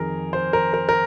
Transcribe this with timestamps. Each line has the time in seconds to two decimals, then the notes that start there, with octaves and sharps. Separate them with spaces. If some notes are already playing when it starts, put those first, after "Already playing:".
Already playing: F2 D#3 G#4 A#4
0.33 C5
0.53 A#4
0.74 A#4
0.89 A#4